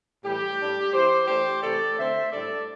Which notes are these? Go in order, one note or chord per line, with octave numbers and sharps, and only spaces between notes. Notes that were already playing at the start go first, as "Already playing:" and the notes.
A2 E3 G3 G4
A2 G3 D4
E3 C4 E4 G4 C5
E3 A3 D4 G4 C5
C3 E3 A3 A4 D5
D3 A3 C4 C5 E5
A2 G3 D4 A4 D5